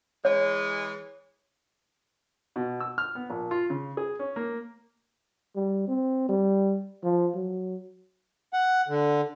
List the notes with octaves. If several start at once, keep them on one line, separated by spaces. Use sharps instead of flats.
E3 G#3 C#5
B2
E6
F6
B3
A#1
F4
C#3
G#4
C#4
A#3
G3
C4
G3
F3
F#3
F#5
D3